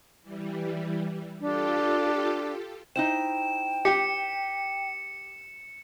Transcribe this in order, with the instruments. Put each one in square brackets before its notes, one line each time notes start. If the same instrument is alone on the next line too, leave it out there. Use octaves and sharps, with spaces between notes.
[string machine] E3 G3
[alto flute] D4 [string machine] F4 G4 A4
[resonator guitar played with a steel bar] D#4 E4 C5 [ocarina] G5 [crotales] E7
[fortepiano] G4 [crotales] C#7